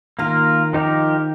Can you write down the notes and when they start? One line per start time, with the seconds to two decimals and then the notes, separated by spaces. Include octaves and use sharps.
0.19 D#3 A#3 F4 A#4
0.73 F3 D#4 G4 A#4